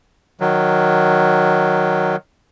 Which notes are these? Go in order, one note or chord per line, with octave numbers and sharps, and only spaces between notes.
D#3 F#3